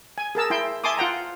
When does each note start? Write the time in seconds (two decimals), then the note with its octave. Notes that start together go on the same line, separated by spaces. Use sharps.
0.18 G#5
0.35 G#4 A#4 A5 E6
0.50 E4 G5 C6
0.84 E5 G#5 A5 C6 D6 D#6
0.98 F4 F#5 G5 A#5